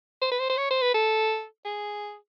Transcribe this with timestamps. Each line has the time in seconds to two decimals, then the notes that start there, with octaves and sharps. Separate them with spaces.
0.21 C5
0.31 B4
0.39 C5
0.49 C5
0.57 C#5
0.70 C5
0.82 B4
0.94 A4
1.65 G#4